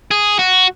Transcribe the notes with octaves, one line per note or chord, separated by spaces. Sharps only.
G#4
F#4